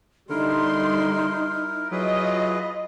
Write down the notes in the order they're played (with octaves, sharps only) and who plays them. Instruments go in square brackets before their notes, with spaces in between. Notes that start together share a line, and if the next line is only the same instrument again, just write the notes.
[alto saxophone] D3 [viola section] G3 C6 [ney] D#4 [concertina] E4 A#4
[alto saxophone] F#3 [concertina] E4 G#4 B4 [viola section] F4 D#5